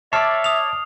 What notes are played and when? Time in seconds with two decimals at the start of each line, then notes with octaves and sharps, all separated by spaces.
0.13 C#5 D5 E5 A5 D6 F6 C7
0.44 D#6 F7